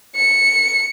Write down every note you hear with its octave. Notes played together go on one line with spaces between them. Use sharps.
C#7